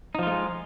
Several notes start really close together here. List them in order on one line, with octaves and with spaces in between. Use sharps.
D#4 F3 F4 A3 G#3